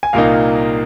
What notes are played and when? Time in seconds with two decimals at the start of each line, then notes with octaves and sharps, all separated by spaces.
0.03 G#5
0.13 C2 A#2 A#3 D#4 F5